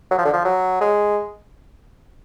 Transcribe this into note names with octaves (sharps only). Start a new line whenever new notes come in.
F#3
F3
D3
F3
F#3
G#3